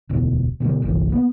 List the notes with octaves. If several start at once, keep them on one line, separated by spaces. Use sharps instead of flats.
E1 D2 B2
B2 D3 F#3 G3
G1 C2 C3 E3
A#3 B3